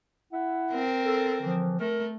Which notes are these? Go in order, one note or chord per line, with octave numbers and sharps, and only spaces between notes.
E4 E5 F#5
C4 A#4
A4
D3 E3 F3
A3 A#4